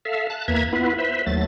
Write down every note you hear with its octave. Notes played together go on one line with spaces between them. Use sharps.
A4 E5 F5
A5 F#6
E2 A#3 B4 E5 A#5 G#6
B3 E4 F4 B4
B4 C5 E5
D#2 F#3 A3 A6